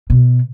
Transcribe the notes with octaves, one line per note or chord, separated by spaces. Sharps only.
B2